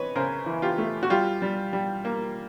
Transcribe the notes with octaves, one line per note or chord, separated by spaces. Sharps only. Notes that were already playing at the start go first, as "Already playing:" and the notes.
Already playing: E3 C4 B4 C#5 D#5
C#3 A#4 C5
E3
F4 G4
A3
F#4
G3 F4 G4
G3
G3
A#3